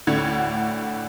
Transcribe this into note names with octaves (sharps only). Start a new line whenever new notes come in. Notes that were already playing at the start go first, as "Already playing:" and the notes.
D2 A2 D3 F#5 G#6